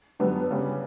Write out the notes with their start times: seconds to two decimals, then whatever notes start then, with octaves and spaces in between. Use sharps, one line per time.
0.19 F#2 D3 G3 B3 D4
0.51 C#3 G3 B3